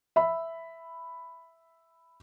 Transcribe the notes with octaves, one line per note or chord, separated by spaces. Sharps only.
E5 B5